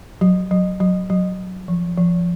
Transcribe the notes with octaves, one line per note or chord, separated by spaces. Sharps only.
F#3
F#3
F#3
F#3
F3
F3